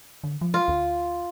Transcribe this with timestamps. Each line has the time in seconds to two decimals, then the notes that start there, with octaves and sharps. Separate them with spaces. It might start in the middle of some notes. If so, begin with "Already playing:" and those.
0.24 D3
0.41 F3
0.54 F4
0.68 D2